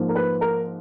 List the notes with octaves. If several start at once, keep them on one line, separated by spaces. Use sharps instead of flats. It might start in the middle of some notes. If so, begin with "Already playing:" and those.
Already playing: G#2 F3 A#3
A#4
B4
A#4